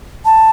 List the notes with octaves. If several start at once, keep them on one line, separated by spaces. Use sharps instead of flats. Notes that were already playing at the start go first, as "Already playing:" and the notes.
A5